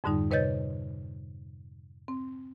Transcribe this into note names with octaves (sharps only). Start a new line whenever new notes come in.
F2 G#2 D3 G3 D#4
C3 B4 C#5 D#5 G6 A6
C4